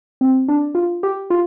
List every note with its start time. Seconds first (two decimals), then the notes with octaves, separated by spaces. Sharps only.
0.21 C4
0.48 D4
0.75 F4
1.03 G4
1.30 F4